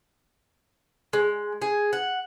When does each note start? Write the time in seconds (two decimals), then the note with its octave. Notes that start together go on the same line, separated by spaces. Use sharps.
1.13 G#3
1.62 G#4
1.93 F#5